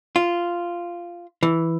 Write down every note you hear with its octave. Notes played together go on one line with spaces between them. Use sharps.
F4
E3